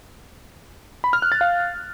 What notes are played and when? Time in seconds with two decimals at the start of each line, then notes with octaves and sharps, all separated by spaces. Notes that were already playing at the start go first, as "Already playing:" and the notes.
1.04 B5
1.13 F6
1.22 F#6
1.32 A6
1.41 F5